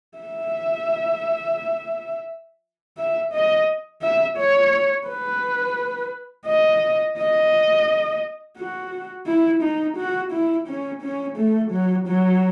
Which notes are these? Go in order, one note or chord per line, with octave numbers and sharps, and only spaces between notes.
E5
E5
D#5
E5
C#5
B4
D#5
D#5
F#4
E4
D#4
F#4
E4
C#4
C#4
A3
F#3
F#3